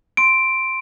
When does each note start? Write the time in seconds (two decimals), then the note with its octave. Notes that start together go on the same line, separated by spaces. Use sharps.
0.17 C6 D7